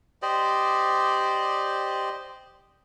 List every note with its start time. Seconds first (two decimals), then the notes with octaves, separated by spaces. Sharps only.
0.22 G4 C5 D5 D#5